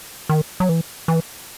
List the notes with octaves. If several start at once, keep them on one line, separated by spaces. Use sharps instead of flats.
D#3
F#3
E3
E3